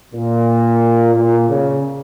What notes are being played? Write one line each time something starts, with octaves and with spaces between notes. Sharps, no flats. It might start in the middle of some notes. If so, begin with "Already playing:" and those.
A#2
A#2
C#3